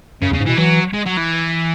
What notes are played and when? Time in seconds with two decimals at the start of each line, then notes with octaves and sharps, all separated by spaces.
0.22 F#2 C#3
0.31 E2
0.34 C#3
0.40 G#2
0.46 B2 E3
0.57 E3 F#3
0.94 G#3
1.06 F#3
1.17 E3